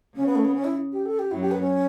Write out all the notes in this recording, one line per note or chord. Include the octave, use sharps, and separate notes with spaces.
C#3 C#4
B3
A3
B3
C#4
E4
G4
A4
G4
F#2 F#3 E4
G4
B4
C#4